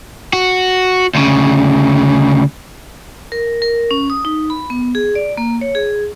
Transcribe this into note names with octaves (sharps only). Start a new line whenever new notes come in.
F#4
D2 C#3
A#4
A#4
C#4
D#6
D#4
B5
B3
G#4
D5
A#3
C#5
G#4